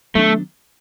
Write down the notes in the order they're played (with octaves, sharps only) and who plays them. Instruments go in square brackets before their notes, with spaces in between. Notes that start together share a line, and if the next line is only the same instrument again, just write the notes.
[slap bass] D#3 F#3 B3 D4 [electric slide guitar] A3